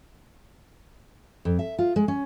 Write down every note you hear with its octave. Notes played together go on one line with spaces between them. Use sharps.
F2
E5
F4
G#3
C#4